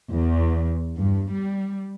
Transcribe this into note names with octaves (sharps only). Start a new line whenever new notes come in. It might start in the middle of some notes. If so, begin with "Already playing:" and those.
E2
G2
G3